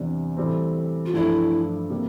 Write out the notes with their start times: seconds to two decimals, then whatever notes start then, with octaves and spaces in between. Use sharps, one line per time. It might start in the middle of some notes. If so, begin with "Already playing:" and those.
Already playing: E2 C3 G3 D4
0.37 A2 E3 G3 C4
1.06 F4
1.14 G2 F3 A3 D4 E4
1.90 C3 G3 A#3